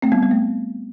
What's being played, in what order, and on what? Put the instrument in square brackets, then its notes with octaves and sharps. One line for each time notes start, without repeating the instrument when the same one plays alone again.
[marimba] A3 C4
G3 B3
G3
A3